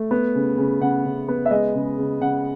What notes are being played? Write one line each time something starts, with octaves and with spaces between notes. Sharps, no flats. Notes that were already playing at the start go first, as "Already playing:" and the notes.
Already playing: A3
B3
C#3
C#3
C#3 F#5
C#3
B3
E5
G#3 D#5
C#3
C#3
C#3 F#5